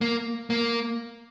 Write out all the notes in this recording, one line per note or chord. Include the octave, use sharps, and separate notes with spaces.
A#3
A#3